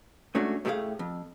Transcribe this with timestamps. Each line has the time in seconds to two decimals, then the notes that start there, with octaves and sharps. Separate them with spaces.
0.35 G#2 A3 C#4 D4 F#4
0.65 A2 G3 A3 G4 G#4 F5
0.99 F2